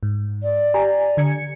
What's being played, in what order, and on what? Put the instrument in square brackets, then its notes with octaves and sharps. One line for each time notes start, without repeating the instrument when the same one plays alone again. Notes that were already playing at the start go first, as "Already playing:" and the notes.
[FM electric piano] G#2
[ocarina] D5
[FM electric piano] G4 G#5 A#5
D3 G#6 C#7